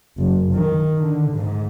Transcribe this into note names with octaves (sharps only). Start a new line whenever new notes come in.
F#1
D#3
D3
G#2